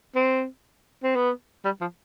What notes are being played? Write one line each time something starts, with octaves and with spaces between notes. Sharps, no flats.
C4
C4
B3
G3
F3